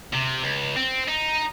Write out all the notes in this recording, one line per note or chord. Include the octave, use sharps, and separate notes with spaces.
C3
C#2
C4
D#4